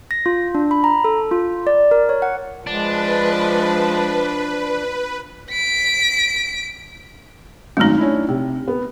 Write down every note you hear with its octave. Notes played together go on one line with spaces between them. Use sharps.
A#6
F4
D4
B5
A#5
A4
F4
D5
A#4
C#5
F#5
F3 G#3 D4 B4
B6 D7
G#1 F#2 A3 D#4 F6
C#4 D4 E4
C3
B3